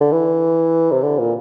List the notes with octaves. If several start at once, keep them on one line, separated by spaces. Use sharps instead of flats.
D3
E3
C3
D3
A#2